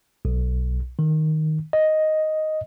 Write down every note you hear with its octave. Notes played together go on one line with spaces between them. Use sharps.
B1
D#3
D#5